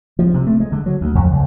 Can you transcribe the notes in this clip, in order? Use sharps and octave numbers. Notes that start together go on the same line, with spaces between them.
F3
C3
A3
G#3
D3
F#3
D2
F2
C#2